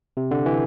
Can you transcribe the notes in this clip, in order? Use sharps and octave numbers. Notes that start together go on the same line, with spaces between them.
C3
D3
E3